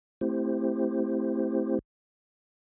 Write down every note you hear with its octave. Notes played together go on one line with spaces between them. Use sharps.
A3 C4 E4 G4 C5